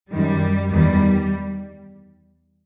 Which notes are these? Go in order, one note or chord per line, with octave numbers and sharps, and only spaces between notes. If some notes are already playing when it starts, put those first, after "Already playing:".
F#2 D#3 G3
E2 D#3 G3